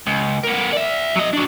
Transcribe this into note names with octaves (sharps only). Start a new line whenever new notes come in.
C#2
B3 A#4
D5 E5
F#3 D#5
F#3 D4